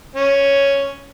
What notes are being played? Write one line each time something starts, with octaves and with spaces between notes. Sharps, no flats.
C#4